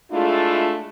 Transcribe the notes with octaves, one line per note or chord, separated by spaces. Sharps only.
G#3 A3 D4 E4 F4